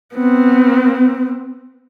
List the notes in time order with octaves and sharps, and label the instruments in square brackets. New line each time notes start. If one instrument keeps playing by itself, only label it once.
[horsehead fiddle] B3 C4